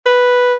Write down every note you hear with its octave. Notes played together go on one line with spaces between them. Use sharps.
B4